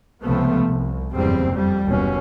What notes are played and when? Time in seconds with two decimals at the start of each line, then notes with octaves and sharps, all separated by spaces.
0.23 C#2 C3 F3 A3 B3
0.65 C2
1.14 F#1 E2 G2 G3 C4
1.52 F2 G3
1.86 F#1 D#2 B2 C#4